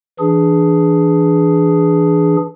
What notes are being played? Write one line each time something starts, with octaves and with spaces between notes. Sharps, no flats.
E3 D4 G#4